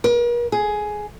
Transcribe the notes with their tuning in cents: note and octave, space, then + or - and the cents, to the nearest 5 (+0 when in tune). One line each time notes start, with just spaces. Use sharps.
A#4 +45
G#4 +10